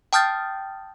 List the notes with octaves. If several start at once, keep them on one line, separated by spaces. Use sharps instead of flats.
G5 A5 D#6 F6 G6 A6